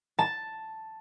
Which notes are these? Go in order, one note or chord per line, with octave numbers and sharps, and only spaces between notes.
A5